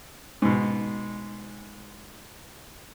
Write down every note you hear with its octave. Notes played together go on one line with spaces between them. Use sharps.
G#2 B2